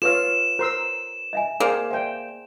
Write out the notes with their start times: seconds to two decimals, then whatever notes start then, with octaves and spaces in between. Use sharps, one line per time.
0.02 F4 A4 B4 C#5 F5 E6 E7
0.59 A#4 C5 C#5 C6 E6
1.33 D#5 E5 G#5
1.60 A#3 G#4 C5 D5 G5
1.91 C5 D5 E5 G5